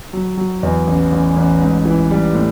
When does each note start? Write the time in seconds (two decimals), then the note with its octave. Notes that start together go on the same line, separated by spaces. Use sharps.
0.13 F#3
0.37 F#3
0.63 E2
0.87 A1
1.12 A1
1.36 A1
1.61 G#2
1.85 E3
2.11 G3
2.35 A2